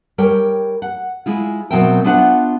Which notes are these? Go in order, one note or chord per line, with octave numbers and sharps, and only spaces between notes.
G3 A#4 C#5 G5
F#5
G#3 E4 F4
B2 F#3 C4 A#4 E5 G5
B3 D4 F4 C5 E5 F#5